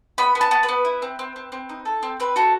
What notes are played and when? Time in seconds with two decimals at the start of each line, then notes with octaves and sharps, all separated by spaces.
0.18 B3 B5
0.35 B3
0.41 A5
0.51 B3
0.63 B4
0.69 B3
0.85 E4
1.02 C4
1.19 C4
1.36 C4
1.52 C4
1.69 D#4
1.85 A4
2.03 C4
2.20 C4 B4
2.36 F#4 A4